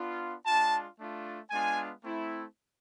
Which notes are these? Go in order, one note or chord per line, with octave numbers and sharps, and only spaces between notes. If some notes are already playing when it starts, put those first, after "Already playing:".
Already playing: B3 D4 F4
G#3 D4 F4 A5
A3 D4 F4
G#3 B3 D4 F4 G#5
A3 C4 E4